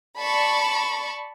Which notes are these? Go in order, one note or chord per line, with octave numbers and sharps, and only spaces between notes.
D5 A5 B5 C#6